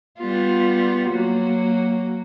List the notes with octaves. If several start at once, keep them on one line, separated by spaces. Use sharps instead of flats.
G3 B3 F4
F#3 A#3 F#4